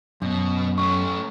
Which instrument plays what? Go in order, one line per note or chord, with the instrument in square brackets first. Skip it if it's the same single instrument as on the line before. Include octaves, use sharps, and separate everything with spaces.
[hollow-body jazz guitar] F#2 [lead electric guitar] B2
[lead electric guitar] A3 C#4 [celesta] C#6